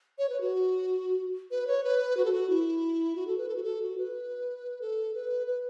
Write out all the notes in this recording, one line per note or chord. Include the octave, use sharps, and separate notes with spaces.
C#5
B4
F#4
B4
C#5
B4
F#4
A4
F#4
E4
F#4
A4
B4
A4
F#4
A4
F#4
B4
A4
B4
B4